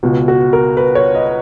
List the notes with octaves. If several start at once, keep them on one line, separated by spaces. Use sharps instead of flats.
C#2 B2
F#4
A#4
B4
C#5
D#5